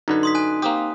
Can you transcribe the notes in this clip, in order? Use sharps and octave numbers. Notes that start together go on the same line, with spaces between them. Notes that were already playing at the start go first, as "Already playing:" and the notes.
F#2 D3 D#4 B4
C6 D#6 B6
G#5 F#6 D#7
A#3 C4 G4 D#6